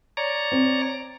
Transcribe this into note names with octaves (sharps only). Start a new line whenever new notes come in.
C#5 D5 A#5
C4